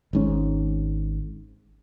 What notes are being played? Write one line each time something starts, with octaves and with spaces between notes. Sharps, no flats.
G#1 G#2 C#4